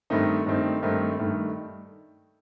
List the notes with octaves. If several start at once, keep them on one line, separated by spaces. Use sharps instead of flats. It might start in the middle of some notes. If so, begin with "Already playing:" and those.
G2 D#3 A3 C4 D#4
G2 D#3 A3 C4 D#4
G2 D#3 A3 C4 D#4
G2 D#3 A3